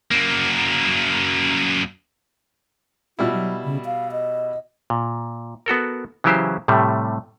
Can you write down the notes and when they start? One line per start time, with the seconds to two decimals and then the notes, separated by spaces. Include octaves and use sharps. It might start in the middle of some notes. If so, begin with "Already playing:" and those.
0.11 F#2 A#3
3.19 B2 G3 E4 F4
3.33 F#3
3.65 C#3
3.85 F5
4.12 D#5
4.90 A#2
5.66 B3 F#4 A4 A#4
6.24 C#3 E3 F#3 E4 G4 C5
6.68 A2 C3 G3 A3